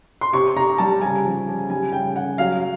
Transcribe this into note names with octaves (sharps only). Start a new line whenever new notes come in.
C6
C3 C#6
C3 A#5
G3 A5
C#3 G#5
F3
C#3
G3 G#5
C#3 G5
C#3 F#5
F#3 F5